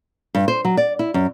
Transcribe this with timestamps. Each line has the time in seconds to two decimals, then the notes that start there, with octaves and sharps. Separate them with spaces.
0.35 G2
0.48 C5
0.65 F#3
0.77 D5
0.99 E4
1.14 F#2